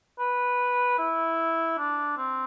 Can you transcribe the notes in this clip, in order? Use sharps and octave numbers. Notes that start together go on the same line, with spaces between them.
B4
E4
D4
C4